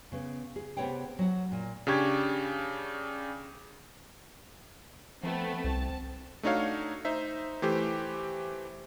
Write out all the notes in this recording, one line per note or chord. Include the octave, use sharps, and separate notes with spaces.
C#3 B3
G#4
C3 G#3 B3 C#5 F#5 G5
F#3 F#5
A#2
C#3 D4 G4 C#6 G#6
F3 A3 B3 C4
C2 C4 A5
A3 D4 D#4 F#4 C#5 F5
D#4 C5 E5
E3 A3 G4 C5